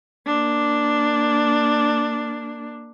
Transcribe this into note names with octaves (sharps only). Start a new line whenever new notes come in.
A#3 D4